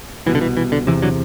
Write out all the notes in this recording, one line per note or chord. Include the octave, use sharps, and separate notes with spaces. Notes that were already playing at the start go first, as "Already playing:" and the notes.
C2 B2 E3
D3
E3
E3
D3
E2 C3 E3
D3 F#3